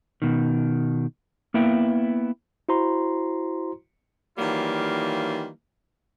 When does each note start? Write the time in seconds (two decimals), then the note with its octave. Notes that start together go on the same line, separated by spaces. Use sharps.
0.22 B2 D#3
1.54 A#3 B3 E4 G5
2.69 E4 F#4 C5 A#5 C6
4.38 D#3 E3 F#3 G3 A#3 F4